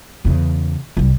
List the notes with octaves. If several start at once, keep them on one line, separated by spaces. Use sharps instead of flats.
E2 C#3
C2 G3